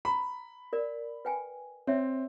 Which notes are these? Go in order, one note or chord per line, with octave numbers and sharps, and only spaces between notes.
A#5 B5
A#4 D5
B4 G5 G#5
C4 C#5 E5